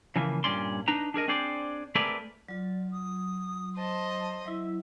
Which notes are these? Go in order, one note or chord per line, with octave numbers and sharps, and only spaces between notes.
C#3 E3 F3 A#3
G2 A#2 C#4 D5 C6
D4 D#4 B4 A#5
D4 G#4 A#4 D#5
C4 D4 G#4 C5 D5
A3 C4 G#4 A#4 B4 D5
F#3 F4 D5
D#6
C5 D#5 A5
F#3 E4 E5